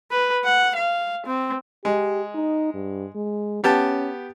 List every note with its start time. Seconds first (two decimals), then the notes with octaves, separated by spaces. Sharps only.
0.11 B4
0.45 F#5
0.76 F5
1.26 C4
1.85 G#3 G4
2.35 D#4
2.74 G2
3.16 G#3
3.64 B3 C#4 G4 A5